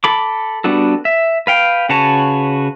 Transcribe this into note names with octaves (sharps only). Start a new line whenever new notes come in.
A4 B5 D6
G3 B3 D4 F#4 A4
E5
B4 F5 G5
C#3 F#4 B4 C#5 A5